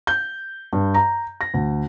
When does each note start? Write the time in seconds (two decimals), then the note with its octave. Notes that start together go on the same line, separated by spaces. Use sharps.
0.07 G6
0.73 G2
0.94 A#5
1.41 A#6
1.54 D2